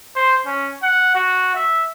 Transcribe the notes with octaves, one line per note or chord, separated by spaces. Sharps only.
C5
C#4
F#5
F#4
E5